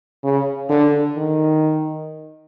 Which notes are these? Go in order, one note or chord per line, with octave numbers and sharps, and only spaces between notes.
C#3
D3
D#3